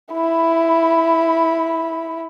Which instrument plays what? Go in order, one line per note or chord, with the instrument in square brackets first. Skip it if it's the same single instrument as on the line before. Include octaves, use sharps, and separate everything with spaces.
[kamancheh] E4 B5